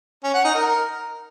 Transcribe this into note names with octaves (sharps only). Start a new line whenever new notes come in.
C#4
F#5
D#4
A#4